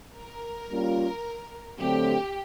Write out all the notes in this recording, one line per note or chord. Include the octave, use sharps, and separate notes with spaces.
A#4
G3 A#3 C#4 F4
D3 F#3 A3 C4 G4